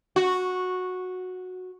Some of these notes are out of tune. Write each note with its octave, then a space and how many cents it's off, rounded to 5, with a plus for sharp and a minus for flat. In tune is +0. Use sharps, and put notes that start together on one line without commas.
F#4 -10